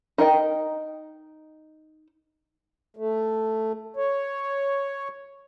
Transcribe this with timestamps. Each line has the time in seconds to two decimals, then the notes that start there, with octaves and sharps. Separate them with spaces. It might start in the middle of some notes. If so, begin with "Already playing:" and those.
0.18 D#4 A#4 D#5 G5
2.97 A3
3.97 C#5